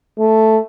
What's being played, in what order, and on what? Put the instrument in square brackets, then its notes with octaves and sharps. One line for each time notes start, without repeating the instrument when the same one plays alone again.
[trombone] A3